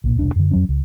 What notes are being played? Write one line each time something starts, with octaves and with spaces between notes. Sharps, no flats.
B1 A#2
E1 C2 D4
F#2 D3
F2 F#3 C#4
C#2